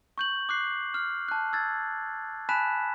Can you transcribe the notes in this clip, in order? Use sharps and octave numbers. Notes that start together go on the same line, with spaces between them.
C#6 G6 F#7
D6 F#6 C7
F6
A5 F#6
E6 G#6 A6
G#5 A5 B5 F#6 B6 E7